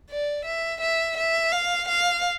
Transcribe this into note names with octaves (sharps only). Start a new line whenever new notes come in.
D5
E5
E5
E5
F5
F5